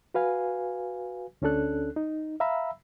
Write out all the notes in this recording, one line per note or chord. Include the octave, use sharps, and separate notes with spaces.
F#4 B4 F5 G#5
D2 C#4 D4 A4 F#6
D#4
E5 F5 A#5 B5 E6